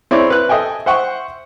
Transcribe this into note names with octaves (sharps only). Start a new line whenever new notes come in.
C4 E4 G#4 C#5 D5
B4 F#6
A4 D#5 E5 G5 G#5
C5 E5 F#5 G5 C#6